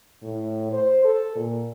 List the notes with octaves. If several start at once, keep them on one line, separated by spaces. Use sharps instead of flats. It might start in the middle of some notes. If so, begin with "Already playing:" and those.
A2
C5
A4
A#2